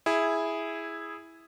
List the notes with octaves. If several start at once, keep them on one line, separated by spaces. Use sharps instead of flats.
E4 G#4